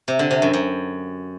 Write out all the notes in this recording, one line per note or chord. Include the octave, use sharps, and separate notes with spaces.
C3
D3
C3
F#2
F#2